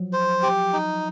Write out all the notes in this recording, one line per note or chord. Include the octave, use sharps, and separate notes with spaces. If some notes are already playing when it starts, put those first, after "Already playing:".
Already playing: F3 F#3
C5
G4
D#4